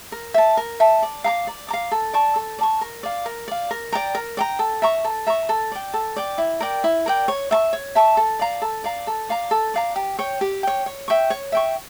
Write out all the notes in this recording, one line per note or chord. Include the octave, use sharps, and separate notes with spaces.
A#4
E5 A5
A#4
E5 A5
D5
F5 A#5 D6
D5
F5 A#5 D6
A4
D5 A5 C#6
A4
D5 A5 C#6
A#4
D5 F5
A#4
D5 F5
A#4
D5 G5 A#5
A#4
D5 G5 A#5
A4
E5 A#5 C#6
A4
E5 A#5 C#6
A4
D5 G5
A4
D5 G5
E4
A#4 D5 G5
E4
A#4 D5 G5
C#5
E5 A5 C#6
C#5
E5 A5 C#6
A4
D5 F5 A#5
A4
D5 F5 A#5
A4
D5 F5 A#5
A4
D5 F5 A#5
G4
C#5 G5
G4
C#5 G5
C#5
E5 G5 C#6
C#5
E5 G5 C#6